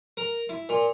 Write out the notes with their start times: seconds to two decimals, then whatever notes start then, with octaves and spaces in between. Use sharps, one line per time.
0.17 A#4
0.49 E4
0.69 A#2